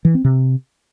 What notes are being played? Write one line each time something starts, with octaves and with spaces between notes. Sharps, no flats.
E3
C4
C3